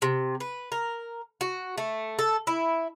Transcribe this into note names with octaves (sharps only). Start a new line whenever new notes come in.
C3
B4
A#4
F#4
A3
A4
E4